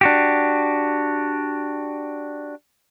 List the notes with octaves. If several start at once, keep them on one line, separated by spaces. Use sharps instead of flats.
D4 F#4 G4